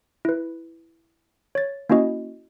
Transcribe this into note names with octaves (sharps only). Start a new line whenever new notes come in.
E4 B4
C#5 A6
A#3 C#4 E4 F#4 D#5